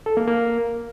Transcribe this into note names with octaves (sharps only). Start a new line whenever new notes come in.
A4
A#3
A#3